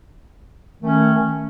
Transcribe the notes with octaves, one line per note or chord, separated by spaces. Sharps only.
D#3 A3 C#4